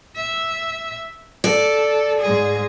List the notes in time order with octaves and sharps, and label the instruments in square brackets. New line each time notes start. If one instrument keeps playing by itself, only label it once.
[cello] E5
[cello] A4 [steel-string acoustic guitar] D5
[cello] G#2 G#4